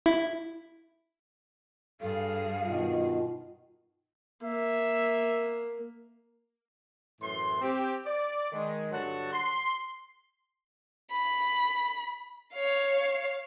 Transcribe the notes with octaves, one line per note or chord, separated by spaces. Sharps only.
E4
G2 G#4 A4 F5
B2 D#3 F4
A#3 E5
F#2 A2 E3 C6
C4 G4
D5
D#3 G#3
G2 D3 F#3 F#4 F#5 A5
C6
B5
C#5 F5